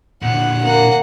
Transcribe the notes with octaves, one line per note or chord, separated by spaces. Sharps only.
A#2 D3 F#5
A#3 F#5